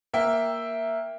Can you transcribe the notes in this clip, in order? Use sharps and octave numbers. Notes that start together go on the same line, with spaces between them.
A#3 E5 G5